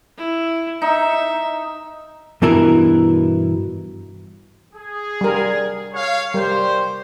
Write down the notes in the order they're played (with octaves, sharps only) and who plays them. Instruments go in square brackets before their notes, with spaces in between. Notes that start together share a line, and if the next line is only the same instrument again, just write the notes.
[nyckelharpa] E4
[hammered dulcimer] D#4 [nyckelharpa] E5
[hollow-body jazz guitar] G2 B2 E3 E4 A#4 B4
[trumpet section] G#4
[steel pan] G3 A#4
[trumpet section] C#5 F5
[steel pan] G3 A#4 [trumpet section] G4 C5